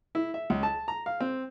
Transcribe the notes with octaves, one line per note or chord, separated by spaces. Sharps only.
E4
E5
C#2
A5
A#5
F5
C4